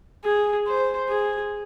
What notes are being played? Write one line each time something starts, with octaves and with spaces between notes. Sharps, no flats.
G#4
C5
G#4